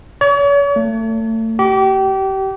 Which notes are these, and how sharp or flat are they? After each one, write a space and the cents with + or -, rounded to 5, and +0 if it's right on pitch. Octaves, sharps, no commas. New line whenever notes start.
C#5 +40
A3 +30
G4 -30